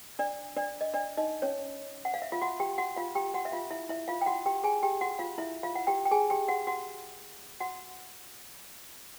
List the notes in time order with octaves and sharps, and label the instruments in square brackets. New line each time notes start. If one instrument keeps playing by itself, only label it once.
[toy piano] D4 D5
D4 D5
D#5
D4 D5
D#4 D#5
C#4 C#5
F#5
F5
E5
F4 F5
F#4 F#5
G4 G5
F#4 F#5
F4 F5
G4 G5
F#4 F#5
E5
F4 F5
E4 E5
E4 E5
F4 F5
G5
F#4 F#5
G4 G5
G#4 G#5
G4 G5
F#4 F#5
F4 F5
E4 E5
F4 F5
F#5
G4 G5
G5
G#4 G#5
G4 G5
F#4 F#5
F#4 F#5
F#4 F#5